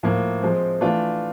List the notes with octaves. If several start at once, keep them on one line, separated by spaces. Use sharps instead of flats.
A2 F3 A#3
F3 G#3 C4
E3 A3 D4 F4